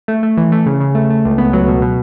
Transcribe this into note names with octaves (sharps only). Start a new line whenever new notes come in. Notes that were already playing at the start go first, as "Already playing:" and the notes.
A3
A3
E3
A3
C#3
C#3
A3
A3
C#2
B3
F#3
B2
B2